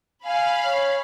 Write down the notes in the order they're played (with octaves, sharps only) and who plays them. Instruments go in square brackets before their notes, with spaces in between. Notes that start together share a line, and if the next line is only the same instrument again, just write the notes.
[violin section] F5 B5 [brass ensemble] G#5
[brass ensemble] C#5